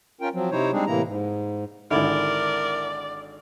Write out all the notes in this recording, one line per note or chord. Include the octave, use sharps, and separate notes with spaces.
C#4 F4 A#4 G5
F3 F#3 C4
C3 D#4 E4 C5 C#5
G3 G#3 C4 D4 D#4 G#4
A2 C3 E3 A#3 E4 A#5
G#2
G#1 D3 E4 A#4 D5